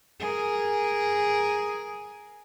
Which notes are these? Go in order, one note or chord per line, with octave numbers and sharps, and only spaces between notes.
G#4 A#4